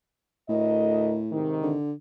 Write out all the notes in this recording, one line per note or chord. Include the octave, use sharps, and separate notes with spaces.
D2 A2 A#4 D#5
G#2 C3 D#3
D3